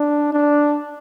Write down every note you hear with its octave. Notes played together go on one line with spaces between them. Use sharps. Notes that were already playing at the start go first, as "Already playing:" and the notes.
Already playing: D4
D4